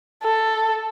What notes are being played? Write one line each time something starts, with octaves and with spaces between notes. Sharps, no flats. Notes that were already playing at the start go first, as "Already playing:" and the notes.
A4